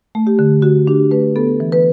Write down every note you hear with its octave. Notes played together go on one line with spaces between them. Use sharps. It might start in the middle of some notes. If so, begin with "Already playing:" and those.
A3
G4
D3
D3 F#4
D4 G4
A3 B4
B3 A4
E3
B4